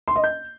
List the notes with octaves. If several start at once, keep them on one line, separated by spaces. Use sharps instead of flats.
C6
D#5
G6